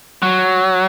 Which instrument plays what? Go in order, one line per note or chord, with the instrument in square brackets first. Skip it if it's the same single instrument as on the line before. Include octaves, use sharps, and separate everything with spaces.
[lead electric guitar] F#3